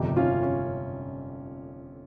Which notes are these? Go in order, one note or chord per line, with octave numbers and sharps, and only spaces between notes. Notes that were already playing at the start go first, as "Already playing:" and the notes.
Already playing: G1 F2 C3 D#3 D#4 G4
C#4 F4
C#4